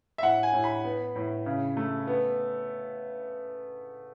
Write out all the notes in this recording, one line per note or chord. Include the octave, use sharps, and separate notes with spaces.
E5
A2 F#5
G#5
A2
B5
B3
A2
C#3
A3
B3